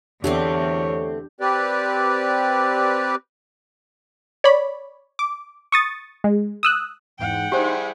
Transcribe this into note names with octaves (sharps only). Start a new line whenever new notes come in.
E2 D3 A3 C4 D4 G4 C#5
C4 G4 B4 D5
C#5 D5 B5
D6
C#6 D#6 A6
G#3
D#6 E6 F#6
E2 G#2 F#5 G5
G3 D#4 E4 G4 G#4 C5 C6